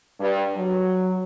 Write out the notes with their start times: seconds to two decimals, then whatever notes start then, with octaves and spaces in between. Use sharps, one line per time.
0.19 G2
0.56 F#3